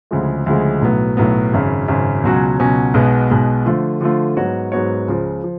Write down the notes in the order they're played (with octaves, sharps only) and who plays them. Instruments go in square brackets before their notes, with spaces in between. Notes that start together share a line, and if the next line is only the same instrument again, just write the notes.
[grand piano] D2 C#3 F3 G#3
D2 C#3 F3 G#3
B1 A2 F#3 B3
B1 A2 F#3 B3
G#1 F#2 C#3
G#1 F#2 C#3
C#2 B2 F#3 C#4 F#4
C#2 B2 F#3 C#4 F#4
B1 B2 G#3 B3
B1 B2 G#3 B3
D3 F3 A3 F4
D3 F3 A3 F4
G#2 F#3 B3 F#4 C#5
G#2 F#3 B3 F#4 C#5
C#2 C#3 F3
F3